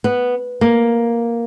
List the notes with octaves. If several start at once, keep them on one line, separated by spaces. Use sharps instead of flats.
B3
A#3